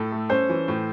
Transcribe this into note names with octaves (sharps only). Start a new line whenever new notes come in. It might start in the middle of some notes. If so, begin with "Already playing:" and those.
Already playing: A2 A4
A3
C#4 C5
E3
A2